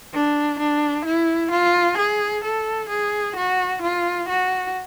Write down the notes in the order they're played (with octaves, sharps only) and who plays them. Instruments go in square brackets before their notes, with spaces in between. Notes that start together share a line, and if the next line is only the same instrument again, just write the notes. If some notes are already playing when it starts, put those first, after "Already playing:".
[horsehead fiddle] D4
D4
E4
F4
G#4
A4
G#4
F#4
F4
F#4